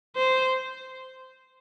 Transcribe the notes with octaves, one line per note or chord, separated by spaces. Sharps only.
C5